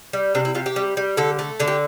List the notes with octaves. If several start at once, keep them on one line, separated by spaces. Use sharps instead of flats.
G3
C3 D4
E4
C3 F4
G4
G3
G3
D3 A4
A3
D3 A4
G4